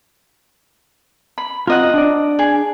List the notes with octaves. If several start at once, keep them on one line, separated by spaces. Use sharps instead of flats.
B5
C4 F4 A#4 D#5 F#5
D4 D5
G#4